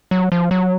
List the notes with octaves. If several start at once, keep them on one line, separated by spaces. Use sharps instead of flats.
F#3
F3
F#3